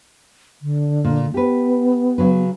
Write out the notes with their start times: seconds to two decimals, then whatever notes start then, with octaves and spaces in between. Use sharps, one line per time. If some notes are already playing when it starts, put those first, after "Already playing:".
0.62 D3
1.04 A#2
1.34 B3 G4 B4
2.18 C#3 F#3 B4